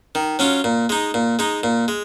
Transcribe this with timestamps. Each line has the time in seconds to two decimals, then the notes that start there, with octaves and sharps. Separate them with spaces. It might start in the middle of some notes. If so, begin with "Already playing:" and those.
0.15 D#3
0.39 F#3 C#4 F4
0.64 A#2
0.89 G#3 D#4
1.14 A#2
1.39 G#3 D#4
1.63 A#2
1.88 G#3